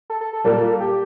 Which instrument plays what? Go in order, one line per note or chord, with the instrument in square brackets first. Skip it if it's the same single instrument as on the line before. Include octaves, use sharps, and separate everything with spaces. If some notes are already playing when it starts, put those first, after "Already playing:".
[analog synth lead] A4
A4
A4
[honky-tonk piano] A#2 G3 A#3 [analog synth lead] A4
[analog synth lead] G4